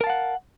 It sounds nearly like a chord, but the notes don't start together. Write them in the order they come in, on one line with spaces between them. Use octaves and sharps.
A#4 A5 F5 F#5